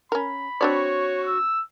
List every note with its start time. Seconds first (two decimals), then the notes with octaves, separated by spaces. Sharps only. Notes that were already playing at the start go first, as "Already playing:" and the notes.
0.12 C#4 A#4 B5
0.61 C4 D4 F#4 C#5 D5
1.24 E6